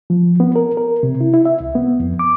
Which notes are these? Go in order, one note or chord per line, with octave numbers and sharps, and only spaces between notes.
F3
B3
A#4
A#4
C3
E4
E4
E5
C2
B3
F2
D6